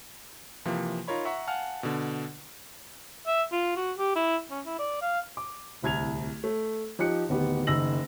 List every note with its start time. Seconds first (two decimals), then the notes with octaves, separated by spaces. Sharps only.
0.65 C3 E3 F3 A#3
1.08 D#4 F4 A#4 C#5 B5
1.25 E5 F#5 A#5 C#6
1.47 F5 F#5 G#5 A5 F6
1.83 B2 D3
3.27 E5
3.52 F4
3.76 F#4
3.98 G4
4.15 E4
4.50 C#4
4.66 E4
4.79 D5
5.01 F5
5.37 D6
5.82 D1 C2 G#6 F7
6.44 A3
6.99 F3 D#4 G4 F#6 C#7
7.29 D1 D#3 B3 G4
7.67 F#1 D#3 E6 A#6 F#7